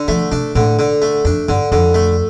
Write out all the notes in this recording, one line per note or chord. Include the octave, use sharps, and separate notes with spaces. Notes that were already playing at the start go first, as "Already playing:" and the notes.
Already playing: D3
F3 A3
C3 D4
A2 D3
D3
A3
F2 D4
G2 D3
F2 D3
A3